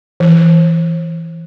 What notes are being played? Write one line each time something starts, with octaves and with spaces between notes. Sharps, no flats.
E3